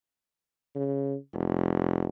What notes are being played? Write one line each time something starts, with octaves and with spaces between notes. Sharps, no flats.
C#3
F1